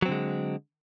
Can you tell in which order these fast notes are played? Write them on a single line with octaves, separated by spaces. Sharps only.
F#3 C4 D3 G#3